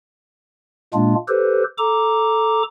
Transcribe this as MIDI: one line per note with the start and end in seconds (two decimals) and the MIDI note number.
0.94 1.15 46
0.94 1.15 56
0.94 1.15 58
0.94 1.15 62
0.94 1.15 65
1.28 1.64 67
1.28 1.64 69
1.28 1.64 71
1.28 1.64 72
1.78 2.63 69
1.78 2.63 82
1.78 2.63 86